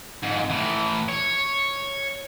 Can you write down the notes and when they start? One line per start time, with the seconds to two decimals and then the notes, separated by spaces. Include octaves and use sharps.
0.23 F2 G#2
0.50 A2 E3
1.09 C#5